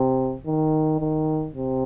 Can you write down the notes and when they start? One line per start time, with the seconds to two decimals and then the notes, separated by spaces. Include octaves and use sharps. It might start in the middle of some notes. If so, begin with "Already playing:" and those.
Already playing: C3
0.46 D#3
1.00 D#3
1.55 C3